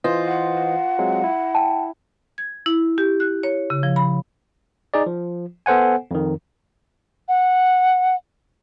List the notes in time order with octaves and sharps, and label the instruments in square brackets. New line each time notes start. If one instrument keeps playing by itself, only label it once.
[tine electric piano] E3 C5 D#5 [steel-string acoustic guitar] F4 [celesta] B4
[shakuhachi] F#5
[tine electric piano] F#3 G#3 C4
E4
[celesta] G5 A5
[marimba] G#6
E4
G4
F#6
C#5
C#3
F3
B5
[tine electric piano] D#4 G#4 D5
F3
B3 A4 C5 F#5 G#5
F2 D#3
[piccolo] F#5